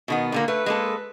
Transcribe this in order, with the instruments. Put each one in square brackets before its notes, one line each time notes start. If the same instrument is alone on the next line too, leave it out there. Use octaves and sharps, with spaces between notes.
[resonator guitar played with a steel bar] B2 D#3 B3
A#2 D3 A#3
[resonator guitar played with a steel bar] A3 [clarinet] B4
[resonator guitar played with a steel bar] G#3 A#3 A4